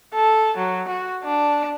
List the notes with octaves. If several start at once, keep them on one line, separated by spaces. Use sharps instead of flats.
A4
F#3
F#4
D4